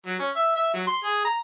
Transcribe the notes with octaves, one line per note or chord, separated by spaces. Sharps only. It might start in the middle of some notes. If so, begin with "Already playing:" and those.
F#3
C#4
E5
E5
F#3
C6
G#4
A#5